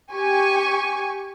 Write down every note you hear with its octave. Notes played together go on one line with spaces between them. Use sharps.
G4 G#5 C#6